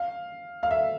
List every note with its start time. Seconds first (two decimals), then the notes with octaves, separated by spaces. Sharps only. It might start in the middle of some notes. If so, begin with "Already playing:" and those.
Already playing: F5
0.63 F5
0.71 E5